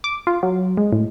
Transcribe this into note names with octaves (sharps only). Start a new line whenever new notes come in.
D6
F4
F#3
G#3
A2